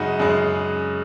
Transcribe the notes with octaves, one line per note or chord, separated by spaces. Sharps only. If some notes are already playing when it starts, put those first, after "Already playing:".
Already playing: F#2 C#3 G#3 D#4 F#4
F#2 C#3 G#3